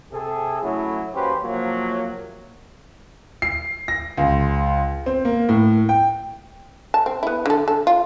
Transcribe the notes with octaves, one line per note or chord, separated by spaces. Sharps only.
C3 G#4 A4
F#3 A3 C#4 E4
D#2 C#4 F#4 G4 B4 C5
C3 F3 F#3 A#3
C7
A#6
C#2
C4
A#3
A2
G5
A5
C4
B3 E4
D3 A4
A4
F4